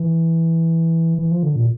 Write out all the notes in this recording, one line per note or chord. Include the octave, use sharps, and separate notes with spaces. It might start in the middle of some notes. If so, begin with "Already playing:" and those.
Already playing: E3
E3
F3
D3
A#2